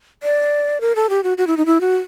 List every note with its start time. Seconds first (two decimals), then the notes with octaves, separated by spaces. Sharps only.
0.23 D5
0.81 A#4
0.96 A4
1.10 G4
1.24 F#4
1.38 F#4
1.47 E4
1.57 D#4
1.66 E4
1.81 F#4